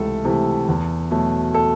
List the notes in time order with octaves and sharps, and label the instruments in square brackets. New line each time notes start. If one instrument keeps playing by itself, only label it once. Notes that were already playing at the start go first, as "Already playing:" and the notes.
Already playing: [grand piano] C#2 C3 E3 A3 A4
C3 E3 A3
E2
B2 F#3 A3
A4